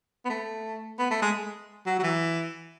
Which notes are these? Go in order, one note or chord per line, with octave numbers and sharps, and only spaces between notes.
B3
A3
B3
A3
G#3
F#3
F#3
E3